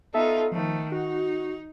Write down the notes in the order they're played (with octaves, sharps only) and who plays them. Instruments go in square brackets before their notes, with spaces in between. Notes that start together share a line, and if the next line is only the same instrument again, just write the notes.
[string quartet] B3 D#4 F4 [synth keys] A4 E5
[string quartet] D#3 A3 [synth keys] F3
[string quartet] D#4 [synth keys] F#4